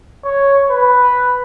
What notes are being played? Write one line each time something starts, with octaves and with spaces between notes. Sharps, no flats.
C#5
B4